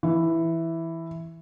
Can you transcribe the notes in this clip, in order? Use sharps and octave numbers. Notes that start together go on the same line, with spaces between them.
E3